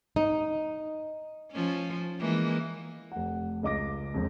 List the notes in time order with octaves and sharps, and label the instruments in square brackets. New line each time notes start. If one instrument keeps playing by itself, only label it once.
[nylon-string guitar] D#4
[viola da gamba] F3 C#4
E3 G#3 A#3
[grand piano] F1 F#5
C#2 D#5 D6 A#6
E1 F2